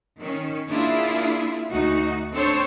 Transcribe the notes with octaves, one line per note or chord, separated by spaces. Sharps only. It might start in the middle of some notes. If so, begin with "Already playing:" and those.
D#3 C#4
A#3 D4 E4 F4 G#4
D2 A3 D#4 F#4
C4 D4 A4 C5 C#5